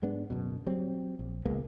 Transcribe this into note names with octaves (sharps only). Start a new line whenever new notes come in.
G#2 G#3 B3 D4
D1 F#2 B2
F#3 G3 C4
A#1
C#2 G#3 A#3 B3